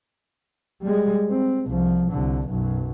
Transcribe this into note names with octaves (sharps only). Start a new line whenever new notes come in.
G3 G#3
C4
C2 F3
C2 D3
B1 F#2